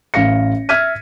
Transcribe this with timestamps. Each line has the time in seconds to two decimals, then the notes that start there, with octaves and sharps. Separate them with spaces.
0.14 A1 F5 A#6 C#7
0.69 E5 F6 G#6 B6 D#7